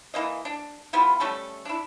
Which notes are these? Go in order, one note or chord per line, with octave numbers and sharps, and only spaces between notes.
E3 A#3 D#5
D4
G3 B3 E4 F4
G3 A3 C#4 A4
D4 E4